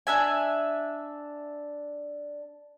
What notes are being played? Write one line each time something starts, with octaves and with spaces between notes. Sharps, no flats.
D4 E5 G#5